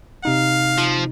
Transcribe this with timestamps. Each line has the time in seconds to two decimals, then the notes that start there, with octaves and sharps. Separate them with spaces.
0.25 C3 D#4 F5
0.78 F3